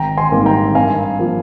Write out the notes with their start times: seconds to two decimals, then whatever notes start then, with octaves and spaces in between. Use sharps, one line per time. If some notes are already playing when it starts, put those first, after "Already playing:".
Already playing: G#1 G5 A#5
0.17 G#5 C6
0.32 G#2 D#3 G3 A#3
0.46 G5 A#5
0.75 G2 F5 G#5
1.19 F3 A#3